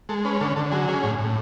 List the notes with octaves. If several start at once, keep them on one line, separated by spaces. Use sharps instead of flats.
G#3 A4
C#4 B4
D3 A4
D3 A4
F#3 G#4
C#4 G#4
A2
A2